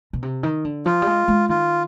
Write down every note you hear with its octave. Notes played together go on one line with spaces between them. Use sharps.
B2
C3
D#3
D3
F3 F4
G3
G#3
G#3
D#3 F4